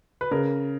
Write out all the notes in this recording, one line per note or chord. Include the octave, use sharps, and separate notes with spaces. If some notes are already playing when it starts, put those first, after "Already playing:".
B4
C#3 A#4